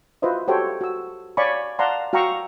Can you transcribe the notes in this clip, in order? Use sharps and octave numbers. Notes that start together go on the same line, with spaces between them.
F4 F#4 B4 C5 D#5 E5
F#4 G4 A4 C5 C#5 G5
F#4 E6
C#5 D5 F5 G#5 B5 C#6
D5 F5 F#5 A5 A#5 C6
F#4 F5 G5 A#5 C#6 E6